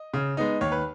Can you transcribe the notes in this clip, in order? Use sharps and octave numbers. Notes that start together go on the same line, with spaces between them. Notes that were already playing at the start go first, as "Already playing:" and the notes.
Already playing: D#5
C#3
G#3 B3 D#4
D#2 C#5
B4